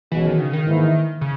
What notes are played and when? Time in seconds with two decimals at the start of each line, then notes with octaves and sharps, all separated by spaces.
0.12 B1 B2 E3 G#3 C#4 F#4
0.26 D#3
0.40 C#3
0.53 D#3
0.66 G#2 E3 A#3 E4
1.21 C#3